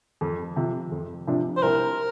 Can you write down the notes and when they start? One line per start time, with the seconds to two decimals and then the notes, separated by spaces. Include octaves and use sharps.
0.21 F2
0.56 C3 F3
0.91 F2
1.27 C3 F3 D4
1.57 C5
1.63 C2 A#4